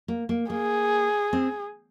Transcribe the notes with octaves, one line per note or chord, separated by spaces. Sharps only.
A#3
A#3
A#3 G#4
C4